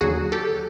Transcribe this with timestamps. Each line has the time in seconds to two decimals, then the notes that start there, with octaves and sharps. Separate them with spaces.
0.01 D#2 D3 F#3 F#4 G#4
0.32 G4 A4